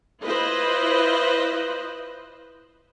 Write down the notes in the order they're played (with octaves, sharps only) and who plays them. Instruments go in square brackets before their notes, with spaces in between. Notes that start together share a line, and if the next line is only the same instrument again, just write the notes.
[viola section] E4 F4 B4 C5 D#5